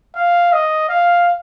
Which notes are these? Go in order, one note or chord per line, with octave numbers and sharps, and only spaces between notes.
F5
D#5
F5